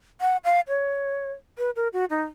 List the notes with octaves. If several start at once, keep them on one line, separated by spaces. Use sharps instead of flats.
F#5
F5
C#5
B4
A#4
F#4
D#4